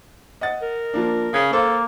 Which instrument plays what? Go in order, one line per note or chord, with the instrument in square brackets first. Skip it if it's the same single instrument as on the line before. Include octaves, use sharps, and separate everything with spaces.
[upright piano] D#5 F#5 A6
[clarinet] A#4
[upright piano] F3 A#3 D4
[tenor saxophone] C#3 [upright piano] G#6
[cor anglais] A#3 [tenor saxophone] A4 [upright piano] C5 F5